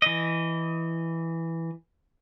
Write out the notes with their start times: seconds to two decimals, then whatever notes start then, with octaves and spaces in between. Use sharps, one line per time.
0.02 E3 D#5